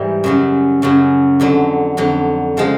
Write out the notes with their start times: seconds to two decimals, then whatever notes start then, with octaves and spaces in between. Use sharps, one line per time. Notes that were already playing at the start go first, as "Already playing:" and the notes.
Already playing: G#2 E3 G3
0.24 F#2 C#3 F#3
0.82 F#2 C#3 F#3
1.40 F2 D3 F#3
1.97 F2 D3 F#3
2.57 C#3 F3 G#3